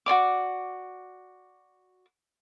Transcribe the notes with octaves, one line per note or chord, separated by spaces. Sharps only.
F#4 C#5 D5 D6